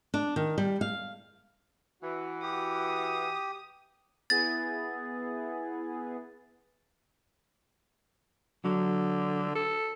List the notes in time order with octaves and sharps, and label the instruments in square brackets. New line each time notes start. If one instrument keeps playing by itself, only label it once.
[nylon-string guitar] D4
D#3
G3
F5
[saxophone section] E3 F#4
[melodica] G4 [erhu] D#6
[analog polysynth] B3 E4 G#4 [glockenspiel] A6
[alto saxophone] D3 [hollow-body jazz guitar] F#3
[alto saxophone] A4